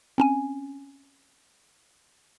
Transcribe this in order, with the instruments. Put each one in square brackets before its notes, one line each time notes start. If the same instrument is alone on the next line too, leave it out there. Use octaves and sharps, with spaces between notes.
[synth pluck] C4 C#4 G#5